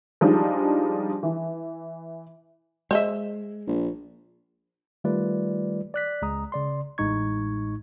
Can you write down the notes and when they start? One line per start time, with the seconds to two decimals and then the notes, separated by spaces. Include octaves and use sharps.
0.21 F3 G3 G#3 D4 D#4
1.23 E3
2.91 G#3 C5 D#5 E5
3.67 A#1
5.04 D#3 G3 A3 F4 B4 D5
5.94 D5 F#6 B6
6.22 C#2 G#3 A#5 D#6
6.52 C#3 D5 C6
6.98 A1 A2 G#3 D#4 C#6 G#6